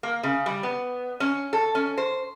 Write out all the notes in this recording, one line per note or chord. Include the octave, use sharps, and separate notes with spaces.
A#3
C#3
G3
B3
C#4
A4
C#4
C5